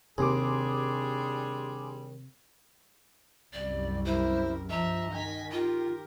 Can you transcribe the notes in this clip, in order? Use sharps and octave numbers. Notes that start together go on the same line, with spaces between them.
D#2 C3 G3 D4 G#4 G#5 C6 D6
C2 F#2 G3 D5
E4 A#4 C5
G2 F3 D#5 E5 A#5
D#3 G#5 B6
F4 G4 A#4